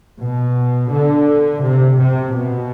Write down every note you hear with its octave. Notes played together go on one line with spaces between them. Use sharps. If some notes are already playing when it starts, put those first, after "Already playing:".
B2
D3
C3
C3
B2